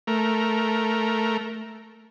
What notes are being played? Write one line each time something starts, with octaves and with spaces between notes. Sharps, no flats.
A3 A#4